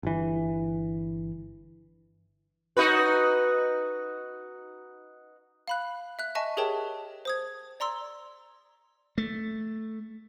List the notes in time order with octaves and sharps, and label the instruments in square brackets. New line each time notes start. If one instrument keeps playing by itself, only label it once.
[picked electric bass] G1 E3
[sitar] D#4 F#4 B4
[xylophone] F5 B5 F#6
E5 F#6
D#5 E5 G#5 A5 C#6
G4 G#4 A#4 C#5 G5 A5
C5 D#6 G#6
D5 A#5 C6 E6
[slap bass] A3